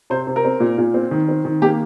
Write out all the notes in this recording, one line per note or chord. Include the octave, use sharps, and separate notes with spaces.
C3 C5
C3
A#4
C4
A#2
A#2
C4
D#3
C4
D#3
A#3 G4